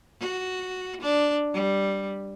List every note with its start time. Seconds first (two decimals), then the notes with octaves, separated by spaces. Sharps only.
0.20 F#4
1.02 D4
1.54 G3